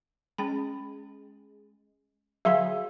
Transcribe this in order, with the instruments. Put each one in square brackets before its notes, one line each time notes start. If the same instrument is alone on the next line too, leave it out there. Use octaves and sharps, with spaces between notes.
[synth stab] G#3 [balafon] C#4 G5 B5
[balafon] D3 F5 C6 [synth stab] F#3 G#4 [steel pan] E5